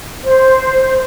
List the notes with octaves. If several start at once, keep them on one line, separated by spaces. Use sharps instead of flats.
C5